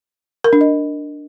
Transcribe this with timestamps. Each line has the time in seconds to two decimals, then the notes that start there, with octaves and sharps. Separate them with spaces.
0.44 A#4
0.53 D4
0.61 D#5